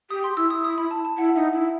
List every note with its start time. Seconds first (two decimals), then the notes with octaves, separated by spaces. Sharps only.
0.10 G4 D#6
0.24 C6
0.37 E4 E6
0.50 D#6
0.64 D#6
0.78 B5
0.91 A5
1.05 A5
1.18 E4 F#5
1.29 F#5
1.35 D#4 E5
1.53 E4 E5